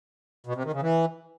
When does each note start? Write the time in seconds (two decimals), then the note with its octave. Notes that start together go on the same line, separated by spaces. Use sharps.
0.47 B2
0.55 C3
0.64 D#3
0.73 C#3
0.82 E3